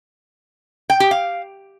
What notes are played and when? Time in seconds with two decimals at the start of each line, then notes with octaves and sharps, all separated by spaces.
0.90 G5
1.00 G4
1.11 F5